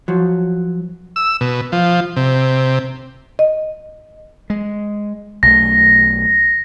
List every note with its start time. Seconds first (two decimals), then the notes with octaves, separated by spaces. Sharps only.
0.08 F3 F#3
1.16 E6
1.41 B2
1.72 F3
2.16 C3
3.39 D#5
4.50 G#3
5.43 B1 A3 A#6